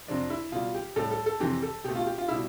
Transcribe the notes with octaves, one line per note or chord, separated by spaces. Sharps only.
F2 C3 F3 D4
E4
B2 G3 F4
G4
A2 G3 A4
A4
A4
F2 C3 E3 G4
A4
B2 A3 G4
F4
G4
F4
B2 G3 E4